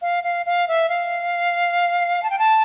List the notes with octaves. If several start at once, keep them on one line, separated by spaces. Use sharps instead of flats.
F5
F5
F5
E5
F5
A5
G5
A5